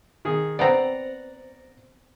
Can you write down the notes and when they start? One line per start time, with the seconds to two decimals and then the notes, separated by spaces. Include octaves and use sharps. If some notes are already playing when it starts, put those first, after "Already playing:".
0.25 D#3 G#4
0.59 B3 C4 D5 F#5 A#5